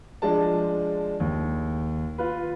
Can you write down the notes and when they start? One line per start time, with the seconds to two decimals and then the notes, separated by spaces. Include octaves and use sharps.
0.22 F3 G#3 D4 A5
1.20 D#2
2.18 F4 B4